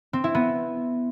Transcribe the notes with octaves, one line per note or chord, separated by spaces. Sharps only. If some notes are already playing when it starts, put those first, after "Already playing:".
C4
E4
B3